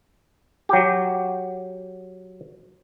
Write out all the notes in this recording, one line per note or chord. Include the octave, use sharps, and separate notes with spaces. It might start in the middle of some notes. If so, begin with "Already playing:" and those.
F#3 G4